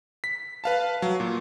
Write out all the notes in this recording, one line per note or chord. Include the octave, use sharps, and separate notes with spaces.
B6
B4 F5 A5
F#3
A#2